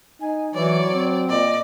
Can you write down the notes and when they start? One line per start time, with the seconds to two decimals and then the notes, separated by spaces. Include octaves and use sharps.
0.21 D#4 G#5
0.55 E3 F#3 C#5 D5
0.92 C4
1.29 A#2 D5 D#5